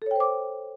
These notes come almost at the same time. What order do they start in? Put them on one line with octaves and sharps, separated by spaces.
A4 C#5 G5 C5 D6